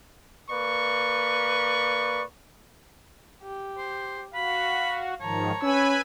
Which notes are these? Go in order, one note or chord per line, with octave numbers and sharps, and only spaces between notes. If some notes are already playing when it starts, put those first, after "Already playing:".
A#3 B4 D5 C#6
G4
C5
F#4 F5 B5
G#2 D#3 F3 C#5 A5 A#5
C#4 B4 G#5 B5 E6